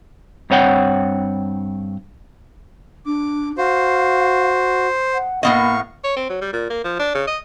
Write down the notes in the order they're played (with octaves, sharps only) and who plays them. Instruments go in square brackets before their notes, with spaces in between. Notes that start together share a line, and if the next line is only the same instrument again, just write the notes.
[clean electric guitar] G2 C4 C#5 F#5 G5
[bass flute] D4 [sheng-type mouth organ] D6
[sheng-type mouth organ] F#4 [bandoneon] C5 [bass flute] F5
[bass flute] F#5
[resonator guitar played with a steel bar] A2 B3 D#5 [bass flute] A#3 [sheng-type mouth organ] F5 C#6
[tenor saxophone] C#5
C4
F#3
G3
A#2
A#3
F3
D4
C#3
D#5